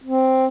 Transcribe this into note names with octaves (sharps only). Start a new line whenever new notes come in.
C4